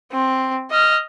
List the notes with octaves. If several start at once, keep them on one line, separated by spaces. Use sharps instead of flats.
C4
D#5 F6